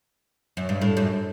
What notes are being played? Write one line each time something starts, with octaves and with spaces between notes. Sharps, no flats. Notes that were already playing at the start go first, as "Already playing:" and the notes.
F#2
G2
A2
F#2